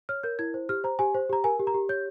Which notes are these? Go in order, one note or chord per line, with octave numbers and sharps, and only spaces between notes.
C#5 F6
A#4 G6
E4 G#6
C5
G4 F6
C5 A#5
G4 G#5
C5
G4 A#5
A#4 G#5
G4
A#5
G4
C#5 G6